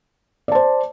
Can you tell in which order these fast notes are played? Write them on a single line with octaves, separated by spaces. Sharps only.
D5 A5 C5